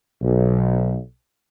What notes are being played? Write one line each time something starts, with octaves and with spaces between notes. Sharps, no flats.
B1